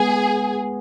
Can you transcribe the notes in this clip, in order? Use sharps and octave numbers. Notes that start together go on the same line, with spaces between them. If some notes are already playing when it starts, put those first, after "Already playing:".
Already playing: G#3 B3 G#4